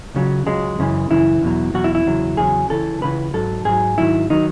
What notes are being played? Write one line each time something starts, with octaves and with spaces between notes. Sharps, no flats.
C#2 C#3 F#3
C#2 C#3 F#3 G#3
F#2 C#3 E3
F#2 C#3 E3 E4
E2 B2 F#3
E2 B2 F#3 F#4
E4
E4
E2 C#3 F#3
E2 C#3 F#3 G#4
C#2 C#3 E3 A4
C#2 C#3 E3 B4
G#2 F#3 A4
G#2 F#3 G#4
G#2 D#3 F#3 E4
D#3 F#3 D#4